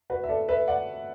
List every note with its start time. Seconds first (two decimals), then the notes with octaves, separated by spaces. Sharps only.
0.10 F#4 B4
0.24 E5
0.29 A4 D5
0.48 B4 E5
0.68 D5 F#5